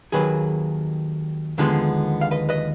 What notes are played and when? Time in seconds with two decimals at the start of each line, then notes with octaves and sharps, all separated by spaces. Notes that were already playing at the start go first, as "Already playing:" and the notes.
0.12 D#2 D#3 F#3 A#3 G#4 B4
1.58 D#2 D3 F3 G#3 B3
2.21 F5
2.31 B4 D#5
2.49 B4 D#5